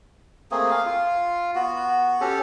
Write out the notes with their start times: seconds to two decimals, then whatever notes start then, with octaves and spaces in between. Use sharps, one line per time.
0.51 A3 A#3 C4 G#4
0.71 F5
0.86 F4
1.55 B3 F#4
2.21 C#4 G4 A4